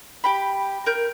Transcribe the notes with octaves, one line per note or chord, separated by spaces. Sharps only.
G4 G5 B5
A#4 G6